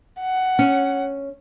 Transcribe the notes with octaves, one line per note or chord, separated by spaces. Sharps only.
F#5
C#4